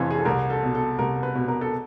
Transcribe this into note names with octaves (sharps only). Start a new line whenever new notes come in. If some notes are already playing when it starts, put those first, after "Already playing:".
Already playing: F1 F2 C3 E3
G#4
A4
C2 A#4
A4
B2
A4
C2 A#4
B4
B2
A#4
A4